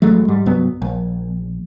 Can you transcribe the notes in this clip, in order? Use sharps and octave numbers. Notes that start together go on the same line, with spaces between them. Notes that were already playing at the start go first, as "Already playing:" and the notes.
A1 F#3 G#3 A3
G#2 G3
C2 G2 F#3 B3
A#1